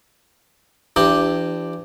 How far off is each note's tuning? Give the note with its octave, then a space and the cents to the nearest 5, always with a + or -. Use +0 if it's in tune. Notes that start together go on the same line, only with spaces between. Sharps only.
E3 +35 D4 +0 G4 +0